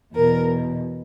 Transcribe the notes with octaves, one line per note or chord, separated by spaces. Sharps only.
E2 B2 A#4